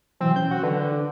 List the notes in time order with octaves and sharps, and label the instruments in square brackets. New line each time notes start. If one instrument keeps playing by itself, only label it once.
[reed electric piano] B2 E3 F#3 [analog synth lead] C4
[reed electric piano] C#4 [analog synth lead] G6
[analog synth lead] F#4
[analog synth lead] D3 [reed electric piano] B4
[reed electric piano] D4